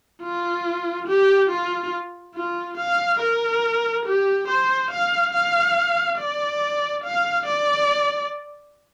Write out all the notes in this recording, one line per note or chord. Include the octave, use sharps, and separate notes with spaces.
F4
G4
F4
F4
F5
A#4
G4
C5
F5
F5
D5
F5
D5